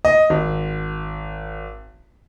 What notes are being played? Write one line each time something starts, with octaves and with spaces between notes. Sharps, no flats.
D#5
G#1